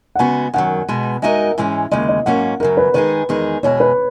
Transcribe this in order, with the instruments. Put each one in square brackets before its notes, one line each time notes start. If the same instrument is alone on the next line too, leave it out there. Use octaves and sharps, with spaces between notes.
[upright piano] F#5
[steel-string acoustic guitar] C#3 G#3 B3 F#4 [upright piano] G#5
[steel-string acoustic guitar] F#2 D#3 F#3 [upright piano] F#5
[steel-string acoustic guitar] B2 G#3 B3
[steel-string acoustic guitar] G#3 D#4 F#4 A#4 D#5 [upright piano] E5
[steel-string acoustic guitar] G#2 E3 G#3 C#4
[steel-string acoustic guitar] D#2 C#3 G#3 [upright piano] D#5
[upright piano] D#5
[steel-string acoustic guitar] G#2 F#3 A#3 C#4 [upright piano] F#5
[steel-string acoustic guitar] F#2 C#3 F#3 [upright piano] A#4
[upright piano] B4
[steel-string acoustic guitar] D#3 G#3 D#4 G#4 [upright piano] B4
[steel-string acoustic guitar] E2 D#3 G#3 D#4 G#4
[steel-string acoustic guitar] E2 B2 G#3 [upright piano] C#5
[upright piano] B4